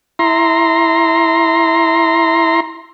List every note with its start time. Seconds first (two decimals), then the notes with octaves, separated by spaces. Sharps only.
0.19 E4 A#5 C6